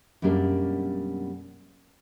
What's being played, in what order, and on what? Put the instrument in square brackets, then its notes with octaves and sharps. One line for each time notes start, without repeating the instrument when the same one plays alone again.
[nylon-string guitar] F#2 B2 G3 A#3 D4 A#4